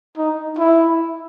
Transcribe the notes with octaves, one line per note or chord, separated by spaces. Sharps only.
D#4
E4